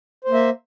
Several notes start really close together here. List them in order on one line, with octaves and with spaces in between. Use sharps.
C5 A#3 E5